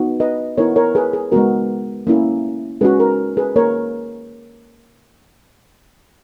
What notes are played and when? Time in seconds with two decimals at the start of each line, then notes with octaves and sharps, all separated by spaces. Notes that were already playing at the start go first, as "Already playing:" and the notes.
Already playing: B3 D#4 F#4
0.20 B4 D#5
0.57 B3 E4 A#4 C#5
0.76 A#4 C#5
0.95 G#4 B4
1.13 G#4
1.32 G#3 B3 F#4 A#4
2.07 A#3 C#4 E4
2.81 G#3 C#4 F#4 G#4 B4
3.00 A#4
3.37 G#4 B4
3.56 A#3 A#4 C#5